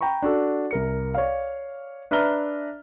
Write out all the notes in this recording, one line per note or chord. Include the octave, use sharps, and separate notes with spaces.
G5 A#5 B5 C#6
D4 F#4 A4
C2 A#4 C#7
C#5 D5 F5
D4 B4 E5 A#5 F6 G7